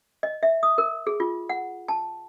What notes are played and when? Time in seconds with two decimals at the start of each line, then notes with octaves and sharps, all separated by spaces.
0.23 D#5
0.43 E5
0.63 D#6
0.78 A#4
1.07 G#4
1.20 F4
1.49 F#5
1.88 A5